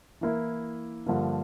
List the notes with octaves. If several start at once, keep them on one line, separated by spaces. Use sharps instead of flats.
E3 A#3 E4
G2 D3 F3 A#3